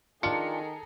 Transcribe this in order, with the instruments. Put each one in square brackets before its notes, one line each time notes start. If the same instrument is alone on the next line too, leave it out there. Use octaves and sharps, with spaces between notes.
[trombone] D#3 [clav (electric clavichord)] D4 F4 [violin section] G#4 A4 A#5 [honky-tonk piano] C#7